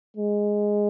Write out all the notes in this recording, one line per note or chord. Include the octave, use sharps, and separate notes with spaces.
G#3